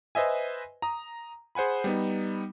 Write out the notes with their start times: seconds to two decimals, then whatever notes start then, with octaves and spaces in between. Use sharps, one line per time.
0.15 B4 C5 D#5 E5 G#5
0.82 A#5 D#6
1.55 G#4 C5 F#5 G#5 B5
1.84 G3 B3 D#4